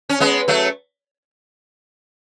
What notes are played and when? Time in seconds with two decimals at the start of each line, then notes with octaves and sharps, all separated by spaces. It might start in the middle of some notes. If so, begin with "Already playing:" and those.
0.09 C#4
0.20 G#3 B3
0.48 F#3 A3